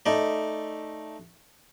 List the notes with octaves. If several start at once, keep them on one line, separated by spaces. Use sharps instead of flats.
A3 D#4 D5